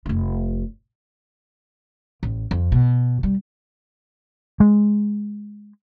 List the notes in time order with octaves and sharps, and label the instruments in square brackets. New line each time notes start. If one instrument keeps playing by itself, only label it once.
[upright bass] F1 A3
A1
F2
B2
G3
[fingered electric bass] G#3